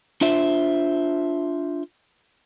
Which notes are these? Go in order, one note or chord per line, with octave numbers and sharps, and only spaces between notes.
D4 F4 C5 E5